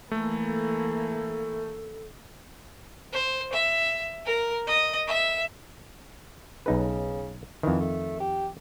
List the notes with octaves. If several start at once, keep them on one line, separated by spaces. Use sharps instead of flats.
E3 A3 A#3 A4
C5
E5
A#4
D#5
E5
B1 C#3 D#4 B4
F2 D#3 E3
A3
G4